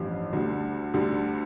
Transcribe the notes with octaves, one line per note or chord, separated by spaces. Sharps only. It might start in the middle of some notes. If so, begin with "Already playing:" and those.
Already playing: A1 G2 F3
D2 D3 G3
D2 D3 G3